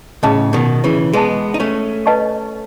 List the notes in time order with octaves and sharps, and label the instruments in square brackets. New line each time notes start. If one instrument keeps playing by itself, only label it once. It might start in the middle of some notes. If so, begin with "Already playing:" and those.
[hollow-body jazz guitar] A2 C#3 [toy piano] G#4 D#5 A5
[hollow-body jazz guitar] B2 D#3
C#3 E3
[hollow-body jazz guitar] G#3 B3 [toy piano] G#4 D#5 A5
[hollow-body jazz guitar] D#4
A3 C#4
[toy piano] B4 D#5 A5 C#6